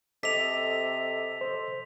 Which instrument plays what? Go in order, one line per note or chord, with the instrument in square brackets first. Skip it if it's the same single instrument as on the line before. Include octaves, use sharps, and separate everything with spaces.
[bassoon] C3 [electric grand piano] A4 D#5 D6 [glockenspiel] B6 F7
[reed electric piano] C5